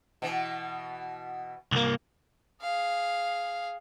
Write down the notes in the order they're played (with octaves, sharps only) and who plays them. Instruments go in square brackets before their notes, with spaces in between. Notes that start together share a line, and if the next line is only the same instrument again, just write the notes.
[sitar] B2 E3
[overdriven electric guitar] C2 A#3
[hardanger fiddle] G#4 F5